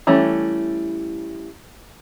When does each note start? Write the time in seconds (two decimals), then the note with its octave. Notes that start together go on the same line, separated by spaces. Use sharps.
0.07 E3 G3 A3 C#4